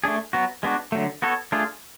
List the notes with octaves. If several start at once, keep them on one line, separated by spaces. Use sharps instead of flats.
A3 D4 G#4
F#3 B3 F#4
G#3 B3 D4 F#4
D3 F#3 A3
B3 F#4 A4 C#5
A3 D4 F4 G#4